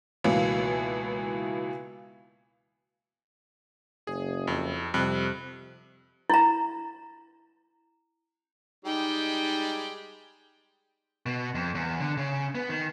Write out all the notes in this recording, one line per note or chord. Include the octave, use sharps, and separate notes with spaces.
C#2 B2 E3 A#3 B3
F#1 G#4
F2
F2 C3 G3 F#6
E4 A#5
G3 G#3 D#4 G5
B2
F2
E2
D3
C#3
B3
D#3